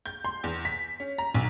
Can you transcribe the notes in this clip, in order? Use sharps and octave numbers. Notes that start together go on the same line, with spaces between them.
G6
C6
E2
B6
C#4
A#5
B1